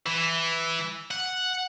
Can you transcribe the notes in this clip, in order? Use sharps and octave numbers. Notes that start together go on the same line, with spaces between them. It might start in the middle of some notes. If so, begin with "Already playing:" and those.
E3
F#5